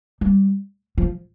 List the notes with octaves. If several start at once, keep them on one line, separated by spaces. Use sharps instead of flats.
G3
F3